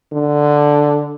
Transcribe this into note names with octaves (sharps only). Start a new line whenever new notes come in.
D3